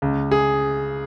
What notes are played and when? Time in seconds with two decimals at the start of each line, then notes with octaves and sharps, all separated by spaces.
0.02 C#2
0.31 G#4